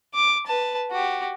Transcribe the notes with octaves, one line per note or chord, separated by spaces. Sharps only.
D6
B4 A5
F#4 G4